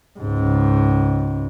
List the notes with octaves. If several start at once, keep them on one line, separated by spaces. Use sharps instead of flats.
C#2 G#2